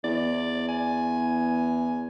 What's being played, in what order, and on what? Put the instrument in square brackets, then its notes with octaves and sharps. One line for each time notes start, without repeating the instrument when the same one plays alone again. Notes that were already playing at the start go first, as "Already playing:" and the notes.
[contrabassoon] E2 [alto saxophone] D5
[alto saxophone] G#5